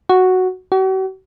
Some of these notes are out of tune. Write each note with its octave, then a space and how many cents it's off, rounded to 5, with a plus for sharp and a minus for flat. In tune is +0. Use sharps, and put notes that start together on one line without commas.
F#4 +0
F#4 +45